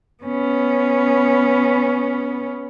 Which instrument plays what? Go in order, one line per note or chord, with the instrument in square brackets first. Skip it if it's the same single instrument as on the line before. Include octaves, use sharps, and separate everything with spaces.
[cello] B3 C#4